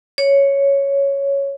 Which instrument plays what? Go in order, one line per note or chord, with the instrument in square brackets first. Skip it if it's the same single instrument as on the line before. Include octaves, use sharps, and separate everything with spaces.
[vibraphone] C#5